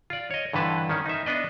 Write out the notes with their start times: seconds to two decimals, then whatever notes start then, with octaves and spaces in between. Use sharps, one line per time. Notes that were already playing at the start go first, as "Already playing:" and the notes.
0.10 F4 D5
0.31 C#5 D#5
0.53 G2 D3 E3 B4 A5
0.89 D#3 C#4
1.06 D#4 E5
1.26 B3 D4 B4 D5 D#5